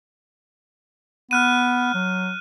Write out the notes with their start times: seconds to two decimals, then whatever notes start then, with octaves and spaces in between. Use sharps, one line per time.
1.31 B3 F6 F#6 D#7
1.94 F#3